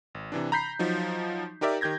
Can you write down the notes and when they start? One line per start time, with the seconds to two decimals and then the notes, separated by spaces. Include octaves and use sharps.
0.15 G#1
0.32 C3 E3 D4
0.52 A#5 B5 G6 B6 C7
0.79 F3 F#3 D#4
1.61 D#4 G4 A#4 D5 E5
1.81 D#3 G4 G6 G#6 A#6